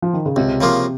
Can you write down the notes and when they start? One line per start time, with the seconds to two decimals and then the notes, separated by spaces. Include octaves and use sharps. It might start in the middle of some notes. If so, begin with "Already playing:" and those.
0.02 F3
0.13 D#3
0.26 C#3
0.36 C#2 C3
0.61 C#3 F3 A#3 F4